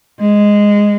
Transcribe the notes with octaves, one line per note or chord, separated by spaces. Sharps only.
G#3